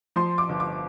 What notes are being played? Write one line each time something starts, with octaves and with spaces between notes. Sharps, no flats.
F3 C6
D6
G1
D6